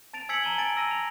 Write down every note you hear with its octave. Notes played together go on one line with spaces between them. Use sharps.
A5 A6 D7 F7
G#5 E6 G#6 B6 C#7 F#7
A5 A#5 D#7 G7
G#5 A5 A6 D7
A5 E6 A#6 D#7
F7